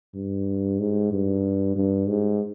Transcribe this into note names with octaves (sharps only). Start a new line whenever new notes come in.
G2
G#2
G2
G2
G#2